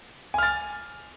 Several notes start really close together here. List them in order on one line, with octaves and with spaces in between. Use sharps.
G#5 F6 A6